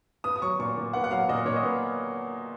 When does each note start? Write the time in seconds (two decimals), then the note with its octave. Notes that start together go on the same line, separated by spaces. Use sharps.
0.24 B3 D#6
0.36 D#6
0.42 F#3 C#6
0.59 A#2 C#6
0.77 A#2
0.93 B3 F#5
1.04 F#5
1.11 F#3 F5
1.29 A#2 D#5
1.45 A#2 C#5
1.56 D#5
1.63 B3